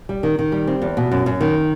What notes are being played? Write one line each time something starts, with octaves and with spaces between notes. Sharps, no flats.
G3
D#3
D#3
G3
C4
E2
B2
F#2
F#2
D#3